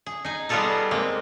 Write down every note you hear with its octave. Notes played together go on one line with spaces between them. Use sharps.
G#4
D#4 G#5
G3 B3 F4 G#4 A4 A#5
G#3 A#3 C4